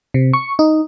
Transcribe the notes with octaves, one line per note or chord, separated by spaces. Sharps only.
C3
C#6
D#4